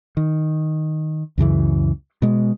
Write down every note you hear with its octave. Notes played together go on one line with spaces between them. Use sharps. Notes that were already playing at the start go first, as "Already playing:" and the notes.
D#3
C#2 F#2 C#3 E3
B2 G#3